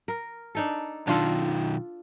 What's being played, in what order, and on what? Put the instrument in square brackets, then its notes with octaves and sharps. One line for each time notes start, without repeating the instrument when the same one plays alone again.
[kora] A#4
D4 D#4 A4
[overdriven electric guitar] B1 D#3 [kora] D4 F4 A4